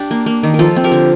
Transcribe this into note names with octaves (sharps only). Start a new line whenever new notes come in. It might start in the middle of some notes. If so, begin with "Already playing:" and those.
Already playing: D4 G4
A#3
A#3
D#3
A#4
F3 F4 A4
C4
G4 A#4
D3